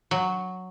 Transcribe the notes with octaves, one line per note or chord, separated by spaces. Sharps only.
F#3